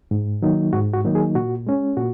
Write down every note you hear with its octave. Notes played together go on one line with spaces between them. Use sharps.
G#2
D#3 F#3 A#3 D#4
G#2 F#4
F#4
D#3 F#3 A#3 D#4
G#4
A#2 F#4
G#3 C#4
A#2 F#4